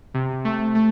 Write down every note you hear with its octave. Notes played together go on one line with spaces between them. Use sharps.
C3
A3
A3